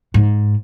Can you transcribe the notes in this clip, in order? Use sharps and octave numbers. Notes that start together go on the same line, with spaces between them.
G#2